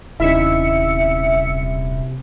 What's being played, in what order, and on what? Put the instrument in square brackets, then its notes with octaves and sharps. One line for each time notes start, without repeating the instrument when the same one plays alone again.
[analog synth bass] D#1 [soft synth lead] C3 [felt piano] C#4 D#4 E4 [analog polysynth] E5 C#7